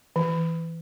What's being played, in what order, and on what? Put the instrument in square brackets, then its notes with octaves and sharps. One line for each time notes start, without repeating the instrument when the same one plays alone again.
[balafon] E3